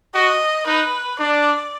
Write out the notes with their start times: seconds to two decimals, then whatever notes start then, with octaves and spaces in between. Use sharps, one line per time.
0.15 F#4 D#5
0.67 D#4 B4
1.20 D4 D5